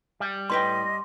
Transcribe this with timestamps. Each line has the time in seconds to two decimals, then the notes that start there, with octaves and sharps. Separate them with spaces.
0.20 G3
0.50 A2 B4 D#5 G5 C6